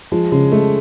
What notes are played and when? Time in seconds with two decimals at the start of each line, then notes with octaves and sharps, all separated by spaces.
0.12 F3 G#3
0.31 C#3 G#3
0.52 G#3 A3